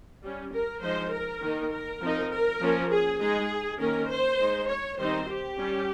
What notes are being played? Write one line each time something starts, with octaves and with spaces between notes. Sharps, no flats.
G3 C#4
A#4
F3 G#3 D#4 C5
A#4
D#3 A#3 D#4
A#4
F3 C4 D#4
A#4
F3 A#3 C#4
G#4
G#3 D#4 G#4
D#3 A#3 C#4 A#4
C5
G#3 D#4
C#5
D#3 G3 C4 D#4 C5
G4
G3 C#4